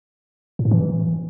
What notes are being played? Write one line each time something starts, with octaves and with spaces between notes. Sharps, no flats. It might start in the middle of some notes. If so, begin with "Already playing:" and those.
A2
G#2
E3